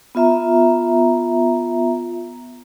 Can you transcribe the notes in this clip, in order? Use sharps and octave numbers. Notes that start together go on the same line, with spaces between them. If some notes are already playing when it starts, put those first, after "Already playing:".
B3 F4 E5 A#5